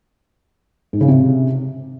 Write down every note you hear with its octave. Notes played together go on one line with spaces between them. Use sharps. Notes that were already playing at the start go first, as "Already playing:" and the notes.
G#2
C#3
C3